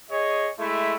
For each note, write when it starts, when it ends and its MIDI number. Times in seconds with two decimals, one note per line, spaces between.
0.10 0.50 68
0.10 0.50 73
0.10 0.50 75
0.59 0.95 56
0.59 0.95 57
0.59 0.95 64
0.59 0.95 76